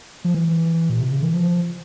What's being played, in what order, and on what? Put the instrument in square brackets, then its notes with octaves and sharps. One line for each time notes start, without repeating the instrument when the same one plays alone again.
[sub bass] F3
E3
A#2
C3
C#3
E3
F3